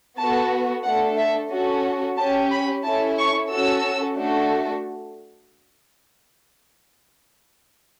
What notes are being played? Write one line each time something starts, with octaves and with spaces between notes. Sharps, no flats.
B3 F#4 A4 A5
A3 D4 A4 F#5
E5
C#4 F#4 A4
C#4 G4 A5
B5
C#4 E4 A4 A5
C#6
C#4 F#4 A4 E6
A3 D4 F#4 A4